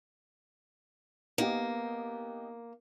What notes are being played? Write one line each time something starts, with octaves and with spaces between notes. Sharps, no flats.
A#3 B3 D#4 G4